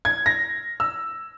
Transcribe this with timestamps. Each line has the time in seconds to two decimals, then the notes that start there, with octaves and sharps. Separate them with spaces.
0.05 G#6
0.26 A#6
0.80 E6